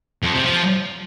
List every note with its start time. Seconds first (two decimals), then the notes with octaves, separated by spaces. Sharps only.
0.22 F2
0.34 C3
0.45 F3